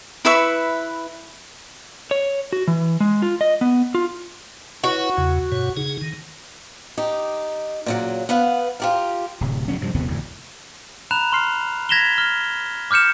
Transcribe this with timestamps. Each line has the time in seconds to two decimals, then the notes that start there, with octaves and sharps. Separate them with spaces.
0.25 E4 B4 E5 C#6
2.11 C#5
2.53 F#4
2.68 E3
3.00 G#3
3.22 F4
3.41 D#5
3.61 B3
3.95 F4
4.84 E4 F#4 B4 C#5
5.17 E2 C#3
5.52 G2 B2 C#5
5.77 C#3 D#4 G#4
6.01 D#3
6.97 D#4 G4
7.86 A#2 C#3 F#3
8.29 B3 B4 F5 F#5
8.80 F4 G4 A#4
9.41 D1 C3
9.68 C#3 F#3 B3 C#4
9.81 G2 C3 F3
9.94 G1 D#2 C3 B3
10.07 F1 D2 A2
11.11 A#5 B5 F#6 E7 F7
11.33 C6 F6 C7
11.89 G#6 A#6 B6 E7 F7 G7
12.18 F6 G7
12.91 D6 F6 G6 C#7 E7